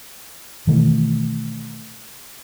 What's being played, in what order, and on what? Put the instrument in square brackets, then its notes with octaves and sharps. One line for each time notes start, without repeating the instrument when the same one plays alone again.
[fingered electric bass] B2 D#3 E3 A3